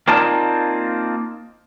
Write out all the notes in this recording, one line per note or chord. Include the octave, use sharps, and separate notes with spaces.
A#3 C4 D#4 F4 D5 A5